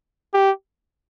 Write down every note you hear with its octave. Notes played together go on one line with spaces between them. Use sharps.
G4